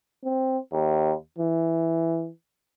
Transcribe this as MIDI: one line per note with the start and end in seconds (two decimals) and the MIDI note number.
0.25 0.58 60
0.72 1.13 39
1.39 2.29 52